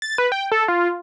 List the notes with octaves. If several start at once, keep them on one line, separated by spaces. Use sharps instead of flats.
A6
B4
G5
A4
F4